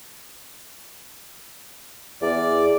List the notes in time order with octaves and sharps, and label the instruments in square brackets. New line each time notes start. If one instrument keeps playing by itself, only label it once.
[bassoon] E2 [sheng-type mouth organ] D5